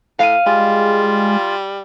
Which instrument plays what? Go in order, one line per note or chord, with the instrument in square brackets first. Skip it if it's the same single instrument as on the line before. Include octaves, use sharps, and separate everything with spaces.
[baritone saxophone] A2 [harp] F5 D#7
[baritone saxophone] G3 [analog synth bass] G#3 [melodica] F4